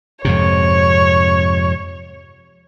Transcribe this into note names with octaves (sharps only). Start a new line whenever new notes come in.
F2 G#2 C3 C#5